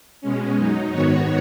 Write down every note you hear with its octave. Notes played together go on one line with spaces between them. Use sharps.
B2 G#3 C#4
F#2 F#3 D#4
G#2 D#3 B3 F#4 C#5